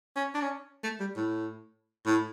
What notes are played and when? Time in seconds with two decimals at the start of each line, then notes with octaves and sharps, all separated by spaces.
0.16 C#4
0.35 D4
0.41 C#4
0.83 A3
1.00 G3
1.17 A2
2.06 A2